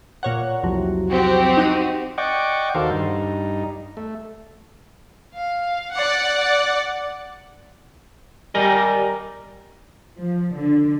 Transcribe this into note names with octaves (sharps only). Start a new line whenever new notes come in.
A#2 C#5 F#5
C2 F2 F#3
C4 F#4 G4
D#4 F#5 D#7
D5 D#5 F#5 G5 C#6 D6
D#2 D#3 F#4 A4 C5 F5
G2 D#4
A3
F5
D5 F#5
G3 A#4 D#5 G#5
F3
D3